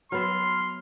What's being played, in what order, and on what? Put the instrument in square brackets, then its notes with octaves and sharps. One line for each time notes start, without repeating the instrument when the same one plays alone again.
[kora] F#3 B3 E5 [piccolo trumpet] C6 [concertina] F6